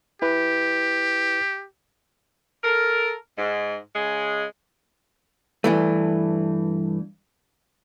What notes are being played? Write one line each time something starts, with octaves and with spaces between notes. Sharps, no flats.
E4 G4 B4
A4 A#4
G#2
C#3 G#3
G2 E3 A3